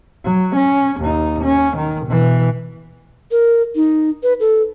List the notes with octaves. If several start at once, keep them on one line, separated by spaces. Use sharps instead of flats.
F#3
C#4
D#2 D#4
C#4
D#3
B2 E3
A#4
D#4
B4
A4